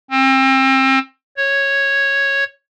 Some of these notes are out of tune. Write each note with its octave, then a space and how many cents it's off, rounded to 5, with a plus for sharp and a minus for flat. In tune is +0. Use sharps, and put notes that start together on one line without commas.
C4 +30
C#5 -5